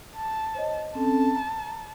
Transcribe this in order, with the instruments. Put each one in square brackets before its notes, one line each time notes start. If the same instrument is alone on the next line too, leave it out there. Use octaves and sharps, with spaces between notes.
[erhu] A5
[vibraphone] C5 C#5 D#5
[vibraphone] C4 C#4 A4 [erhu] A5
[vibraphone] A#5